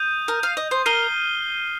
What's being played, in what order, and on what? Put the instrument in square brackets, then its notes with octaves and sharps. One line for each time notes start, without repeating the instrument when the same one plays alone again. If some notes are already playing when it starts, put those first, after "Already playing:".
Already playing: [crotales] D#6 G6 D#7
[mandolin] A#4
F5
D#5
C5
[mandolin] A#4 [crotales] F6 C7 D#7 G7